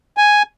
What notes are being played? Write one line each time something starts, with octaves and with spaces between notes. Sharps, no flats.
G#5